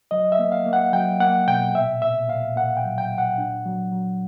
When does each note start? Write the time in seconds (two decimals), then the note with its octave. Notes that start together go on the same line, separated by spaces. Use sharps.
0.11 F#3 D#5
0.32 E5
0.39 A#3
0.52 F5
0.66 A#3
0.73 F#5
0.93 F#3 G5
1.20 A#3 F#5
1.48 B2 G5
1.74 A#2 E5
2.02 A#2 E5
2.29 A#2 F5
2.56 A#2 F#5
2.77 G5
2.84 F#3
2.98 G5
3.11 A#2
3.18 F#5
3.38 D4
3.66 F#3
3.92 F#3